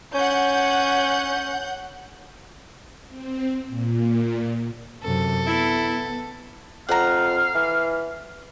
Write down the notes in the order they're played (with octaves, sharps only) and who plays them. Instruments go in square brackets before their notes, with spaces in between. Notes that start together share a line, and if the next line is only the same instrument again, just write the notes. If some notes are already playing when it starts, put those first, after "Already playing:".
[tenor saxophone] C#4 [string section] F#5 G6
[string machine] C4
A#2
[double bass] F#2 C3 [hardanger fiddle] A4
[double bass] B3 [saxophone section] E4
[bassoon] F2 [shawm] F5 [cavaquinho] F#5 A#5
[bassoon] E3